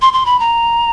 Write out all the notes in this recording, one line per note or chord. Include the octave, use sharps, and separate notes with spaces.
C6
C6
B5
A#5